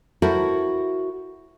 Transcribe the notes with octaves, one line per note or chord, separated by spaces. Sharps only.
E4 F#4 A4 A#4 C5